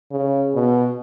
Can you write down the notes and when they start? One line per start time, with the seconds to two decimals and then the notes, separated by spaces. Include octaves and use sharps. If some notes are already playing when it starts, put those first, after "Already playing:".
0.11 C#3
0.54 B2